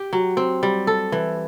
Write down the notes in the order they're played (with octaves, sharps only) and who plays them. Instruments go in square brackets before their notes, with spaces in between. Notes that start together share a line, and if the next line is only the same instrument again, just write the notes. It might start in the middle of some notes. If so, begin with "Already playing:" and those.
Already playing: [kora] G4
F#3
C4
G3
A4
E3